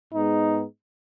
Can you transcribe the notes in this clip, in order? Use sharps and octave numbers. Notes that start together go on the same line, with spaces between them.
G#2 G#3 B3 D#4